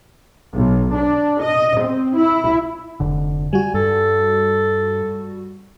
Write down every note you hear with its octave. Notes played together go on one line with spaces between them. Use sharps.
B1
D4
D#5
C4
E4
F1 D3
G3 F#4 G#5
G2 A4